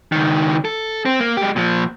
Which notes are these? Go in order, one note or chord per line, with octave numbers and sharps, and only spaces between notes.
C#2 D#3
A4
C4
A#3
G#3 G4
A#2 F3